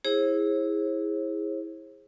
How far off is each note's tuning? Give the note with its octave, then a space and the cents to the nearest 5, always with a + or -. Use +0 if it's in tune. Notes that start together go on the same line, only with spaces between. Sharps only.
E4 -15 G#4 -15 C5 +40